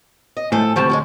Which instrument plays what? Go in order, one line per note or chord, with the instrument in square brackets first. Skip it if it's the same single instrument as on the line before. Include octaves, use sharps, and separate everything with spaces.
[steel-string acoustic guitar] D#5
[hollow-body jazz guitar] A2 A3 [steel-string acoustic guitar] F3 A4 [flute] G#5
[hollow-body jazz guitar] D2 A5 [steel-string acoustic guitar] C3 F3 G3 [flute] C#6
[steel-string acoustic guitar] F3 F#3 G#3